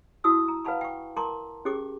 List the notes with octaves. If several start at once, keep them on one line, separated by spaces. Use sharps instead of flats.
E4 F#4 A5 D#6 E6
A#5
B4 F5 F#5 A5 B5 C#6
G5 C#6
A#4 A5 A#5 C6 D6
C#4 G4 G#4 D6